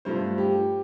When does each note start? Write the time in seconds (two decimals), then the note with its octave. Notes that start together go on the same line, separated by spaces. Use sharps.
0.05 G2 F3 A3 C5
0.38 G4